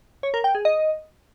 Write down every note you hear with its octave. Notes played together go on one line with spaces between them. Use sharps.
C#5
A#4
G5
G#4
D#5